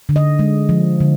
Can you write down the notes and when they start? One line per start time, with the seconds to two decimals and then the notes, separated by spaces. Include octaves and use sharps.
0.09 D3
0.16 D#5
0.39 G#3
0.69 F3
1.00 D3